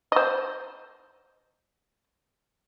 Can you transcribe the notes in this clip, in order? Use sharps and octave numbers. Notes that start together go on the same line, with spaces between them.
C5 D#5